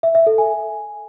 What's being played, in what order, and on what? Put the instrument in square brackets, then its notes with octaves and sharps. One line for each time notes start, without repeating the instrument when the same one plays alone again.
[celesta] E5
E5
A4
G#5